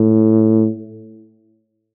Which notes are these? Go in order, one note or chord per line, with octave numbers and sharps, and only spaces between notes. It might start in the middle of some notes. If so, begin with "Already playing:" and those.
Already playing: A2